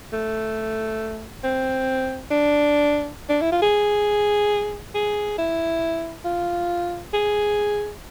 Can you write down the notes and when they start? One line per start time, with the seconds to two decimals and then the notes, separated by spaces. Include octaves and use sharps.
0.12 A3
1.44 C4
2.31 D4
3.29 D4
3.41 E4
3.52 F4
3.62 G#4
4.95 G#4
5.38 E4
6.25 F4
7.13 G#4